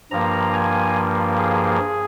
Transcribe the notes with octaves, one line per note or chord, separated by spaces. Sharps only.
G2 F3 A#3 A#5
G#5
G#4